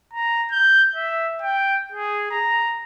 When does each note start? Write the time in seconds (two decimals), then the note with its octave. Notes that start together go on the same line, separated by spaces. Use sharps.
0.14 A#5
0.51 G6
0.96 E5
1.42 G5
1.92 G#4
2.31 A#5